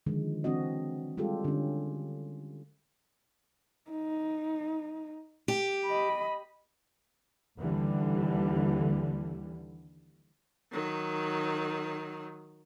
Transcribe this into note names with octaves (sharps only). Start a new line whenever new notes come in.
D3 D#3 F3 G#3
E3 C4 D4 F#4 D#5
G3 G#3 F4 G4 A4
D3 C#4
D#4
G4
D#5 B5
D#2 D3 E3 G3
D#3 F#3